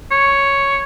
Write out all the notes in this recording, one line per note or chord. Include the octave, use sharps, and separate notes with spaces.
C#5